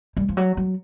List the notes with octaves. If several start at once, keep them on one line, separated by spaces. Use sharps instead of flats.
G3
F3
F#3
F#3